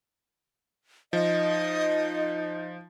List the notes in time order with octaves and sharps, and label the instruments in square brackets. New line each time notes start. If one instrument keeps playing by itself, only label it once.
[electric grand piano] F3 [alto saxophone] D#4 [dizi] D#5